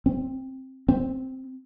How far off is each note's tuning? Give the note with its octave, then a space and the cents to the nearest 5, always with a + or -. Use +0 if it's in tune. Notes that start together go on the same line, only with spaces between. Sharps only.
C4 +10
C4 +0